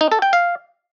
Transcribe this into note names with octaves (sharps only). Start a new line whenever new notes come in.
D#4
A4
G5
F5